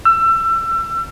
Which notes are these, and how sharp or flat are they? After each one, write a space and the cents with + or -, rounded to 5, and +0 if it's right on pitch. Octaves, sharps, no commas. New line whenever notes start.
E6 +30